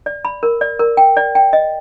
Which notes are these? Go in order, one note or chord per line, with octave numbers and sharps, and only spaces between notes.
D5
B5
A#4
D5
A#4
G5
D5
G5
D#5